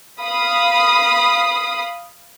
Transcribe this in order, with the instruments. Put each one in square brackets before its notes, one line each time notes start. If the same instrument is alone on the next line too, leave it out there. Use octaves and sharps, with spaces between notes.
[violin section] F5 B5 D#6 C7